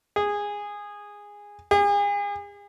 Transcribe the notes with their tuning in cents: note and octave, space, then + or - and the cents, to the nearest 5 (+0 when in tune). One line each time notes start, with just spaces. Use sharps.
G#4 -15
G#4 -40